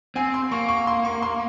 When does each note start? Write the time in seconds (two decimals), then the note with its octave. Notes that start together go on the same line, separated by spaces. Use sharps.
0.16 C4 G#5
0.34 C6
0.51 A#3 C#6
0.69 C#6
0.87 C6
1.05 C#6
1.22 C6